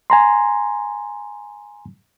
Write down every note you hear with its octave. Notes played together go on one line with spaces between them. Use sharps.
G#5 A#5 C6